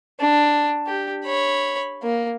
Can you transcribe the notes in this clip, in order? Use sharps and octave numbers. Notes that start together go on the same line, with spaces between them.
D4
G4
C#5 B5
A#3